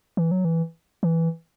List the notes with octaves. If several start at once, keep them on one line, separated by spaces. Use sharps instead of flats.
E3
F#3
E3
E3